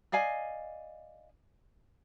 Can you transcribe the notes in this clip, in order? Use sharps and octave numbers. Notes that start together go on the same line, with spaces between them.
D5 D#5 F5 G#5